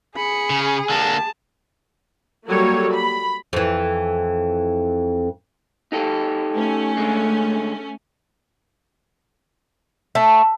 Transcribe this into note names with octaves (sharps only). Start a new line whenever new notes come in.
G#4 B5 C#7
C#3
D3 A#3 A5
F#3 G3 A#3 F#4 A4 C#5
B5
F2 E3
D#4 G4 A4
A3 C#4
D3 G#3
A3